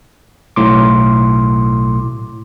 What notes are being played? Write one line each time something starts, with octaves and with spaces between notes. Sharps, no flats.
B1 A2 C6 D6